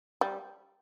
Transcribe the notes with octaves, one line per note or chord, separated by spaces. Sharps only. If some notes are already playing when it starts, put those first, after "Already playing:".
G3